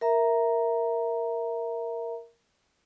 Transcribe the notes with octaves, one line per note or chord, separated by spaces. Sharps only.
A#4 E5 A#5